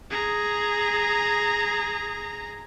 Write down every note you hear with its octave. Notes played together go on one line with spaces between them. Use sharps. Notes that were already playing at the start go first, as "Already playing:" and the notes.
G#4 A#5